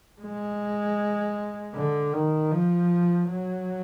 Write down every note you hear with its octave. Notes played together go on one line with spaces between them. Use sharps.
G#3
D3
D#3
F3
F#3